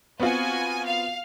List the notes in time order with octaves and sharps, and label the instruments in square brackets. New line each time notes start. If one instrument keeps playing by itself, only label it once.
[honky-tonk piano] B3 C4 F4 [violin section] F#4 G#5
[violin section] F5